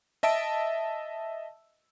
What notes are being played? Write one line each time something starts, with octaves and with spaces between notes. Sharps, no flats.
D#5 E5 A5 E6 D7